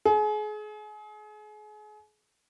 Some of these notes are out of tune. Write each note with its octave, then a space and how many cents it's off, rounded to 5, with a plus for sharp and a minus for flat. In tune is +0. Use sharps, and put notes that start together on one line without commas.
G#4 +35